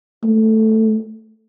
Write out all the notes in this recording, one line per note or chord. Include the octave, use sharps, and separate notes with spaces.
A3